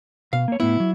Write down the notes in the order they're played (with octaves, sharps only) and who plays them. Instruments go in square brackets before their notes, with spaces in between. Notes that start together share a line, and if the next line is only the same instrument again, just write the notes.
[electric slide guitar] B2 [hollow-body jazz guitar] F5
[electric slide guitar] A#3 C#5
[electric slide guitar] A2 B3 [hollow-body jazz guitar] E4
[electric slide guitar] F#3